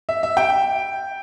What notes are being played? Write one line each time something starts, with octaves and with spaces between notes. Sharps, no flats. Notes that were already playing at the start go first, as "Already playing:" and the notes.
E5
E5
G5